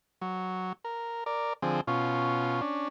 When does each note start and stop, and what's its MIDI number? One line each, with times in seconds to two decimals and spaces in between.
0.21 0.73 54
0.85 1.24 70
1.26 1.53 70
1.26 1.53 74
1.62 1.81 50
1.62 1.81 53
1.62 1.81 60
1.62 1.81 68
1.87 2.61 47
1.87 2.61 61
1.87 2.61 65
2.61 2.88 61
2.61 2.88 62